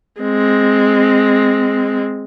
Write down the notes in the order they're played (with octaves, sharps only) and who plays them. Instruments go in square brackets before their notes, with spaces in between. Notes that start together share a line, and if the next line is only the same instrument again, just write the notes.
[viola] G#3 C4